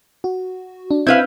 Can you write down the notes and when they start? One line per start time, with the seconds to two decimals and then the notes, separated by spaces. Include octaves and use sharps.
0.24 F#4
0.91 D4
1.07 C4 E4 B4 F5 G6